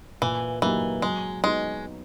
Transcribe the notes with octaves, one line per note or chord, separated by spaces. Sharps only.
A#2 E3
E3 F#3 A#3 D#4 G4
F#3 G#3
G#3 B3 D#4 F#4